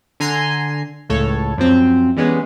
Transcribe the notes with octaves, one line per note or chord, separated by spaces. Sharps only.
D3 G#5 A#5 C6 C7
C#2 A2 A4 C#5
F#2 F3 C4
E3 G3 G#3 B3 C#4